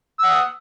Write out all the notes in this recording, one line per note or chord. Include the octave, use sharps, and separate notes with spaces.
F#5 D#6 E6